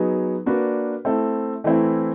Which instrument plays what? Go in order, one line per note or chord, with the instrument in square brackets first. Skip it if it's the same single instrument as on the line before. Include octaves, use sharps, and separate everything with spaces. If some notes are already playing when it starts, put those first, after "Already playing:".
Already playing: [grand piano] F#3 B3 D#4 G#4
A#3 D4 F#4 B4 D5
A3 C4 E4 A4
E3 A3 C4 E4